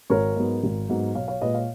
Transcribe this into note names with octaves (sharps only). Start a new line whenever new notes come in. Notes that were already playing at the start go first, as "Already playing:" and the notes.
G#1 A#4 C#5
G#2 F#3 B3
G#1
G#2 F#3 B3
B1 C#5 F5
C#5 F5
A#2 G#3 B4 D#5
C#5 F5